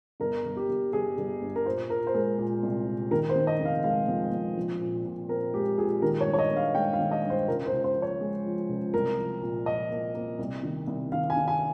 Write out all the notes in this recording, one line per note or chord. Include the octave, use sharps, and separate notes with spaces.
G1 A#4
G1
G4
G1
G1 G#4
G1
G2
A#4
A#2 C5
A#2 A#4
C5
G#3 A#4
A#2
C2
A#2
D#3 A#4
C5
D#3
D#5
F1
F5
G#3 F5
F2
F2
A#1
A#2
A#2
C4 A#4
G#3 G4
A#2 G#4
D#3 A#4
C#5
G2
C#5
D#5
G2
F5
G#3 G5
F5
D#3
D#5
G2
C5
C#2 A#4
C5
C#2
C5
F3
C#5
G#3
F3
C#2
C2 A#4
F3
A#2
F3 D#5
A#3
A#3
C2
D#3
C2
D#3 F5
G#5
D#3
G#5